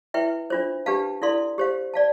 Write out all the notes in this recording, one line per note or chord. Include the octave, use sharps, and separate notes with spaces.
E4 B4 E5 G5
D4 F4 C5
D4 G4 B4 F5 A5
E4 A4 D5 F5 C6
G4 C5 F5
D5 F5 A5